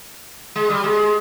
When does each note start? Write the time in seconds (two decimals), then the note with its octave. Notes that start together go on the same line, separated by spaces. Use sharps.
0.56 G#3
0.70 G3
0.84 G#3